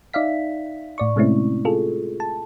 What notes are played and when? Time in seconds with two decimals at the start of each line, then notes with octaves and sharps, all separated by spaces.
0.13 D#4 D5 E5 F5 B6
0.98 A2 D5 C#6
1.16 C3 G#3 A3 C4 C#4 E4
1.65 F4 G#4 A4
2.20 A5